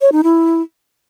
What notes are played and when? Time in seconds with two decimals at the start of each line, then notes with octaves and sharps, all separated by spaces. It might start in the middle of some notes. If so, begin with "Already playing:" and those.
0.01 C#5
0.12 D#4
0.23 E4